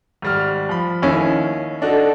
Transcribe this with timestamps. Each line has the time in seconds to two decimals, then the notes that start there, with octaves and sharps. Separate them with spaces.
0.22 G#1 G3 F6
0.69 F3 B5
1.02 D#2 C#4 E4
1.82 D4 D#4 F#4 A4